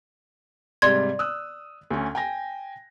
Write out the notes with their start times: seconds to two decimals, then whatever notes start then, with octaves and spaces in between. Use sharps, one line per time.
0.82 G#2 C3 G3 D5 C6 G#6
1.19 D#6 E6 F#6
1.90 D2 C#4
2.15 G5 G#5 A#6